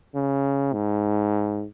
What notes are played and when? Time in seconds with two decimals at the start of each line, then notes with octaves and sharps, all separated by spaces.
0.15 C#3
0.73 G#2